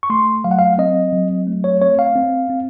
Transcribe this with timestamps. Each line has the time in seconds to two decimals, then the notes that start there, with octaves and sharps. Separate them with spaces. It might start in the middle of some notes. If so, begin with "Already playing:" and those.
0.03 C#6
0.10 A3 C6
0.44 F#3 F5
0.51 F#5
0.59 F5
0.78 C4 D#5
1.13 F#3
1.47 A3
1.64 C#5
1.81 C4 C#5
1.99 F5
2.16 C4
2.50 C4